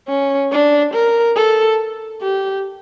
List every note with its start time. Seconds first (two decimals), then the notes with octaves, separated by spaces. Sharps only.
0.09 C#4
0.52 D4
0.94 A#4
1.36 A4
2.21 G4